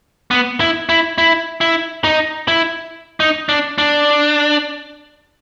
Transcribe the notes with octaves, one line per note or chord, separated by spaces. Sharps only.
B3
E4
E4
E4
E4
D#4
E4
D#4
D4
D4